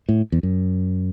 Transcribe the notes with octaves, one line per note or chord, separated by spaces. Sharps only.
A2
E2
F#2